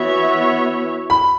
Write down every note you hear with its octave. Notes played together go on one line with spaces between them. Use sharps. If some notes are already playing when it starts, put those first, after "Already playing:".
Already playing: E3 B3 F#4 C#5 E5
B5